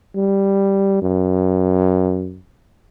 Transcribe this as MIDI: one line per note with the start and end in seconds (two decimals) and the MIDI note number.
0.16 1.01 55
1.02 2.39 42